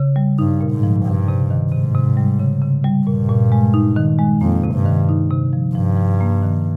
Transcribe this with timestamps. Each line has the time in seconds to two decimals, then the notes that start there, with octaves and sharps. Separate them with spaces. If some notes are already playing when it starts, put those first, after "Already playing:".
Already playing: C#3
0.16 G3
0.39 G2 D#4
0.61 A#2
0.72 G#2
0.83 F3
1.05 G2 C3
1.28 C3
1.51 D#3
1.72 G#2 C3
1.95 C3
2.17 G3
2.39 C#3
2.62 C#3
2.84 G3
3.07 G2 A#2
3.29 A#2
3.52 G#3
3.74 D#4
3.96 D#3
4.19 G#3
4.41 F2 A#3
4.64 C3
4.75 G2
4.86 D#3
5.09 D#4
5.31 C3
5.53 F3
5.75 G2 F3
5.97 F3
6.21 A#3
6.42 D#3